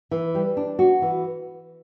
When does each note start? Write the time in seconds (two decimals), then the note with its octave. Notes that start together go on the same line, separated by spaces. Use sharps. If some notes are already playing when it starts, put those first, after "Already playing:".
0.11 E3
0.35 G3
0.57 D4
0.79 F#4
1.02 E3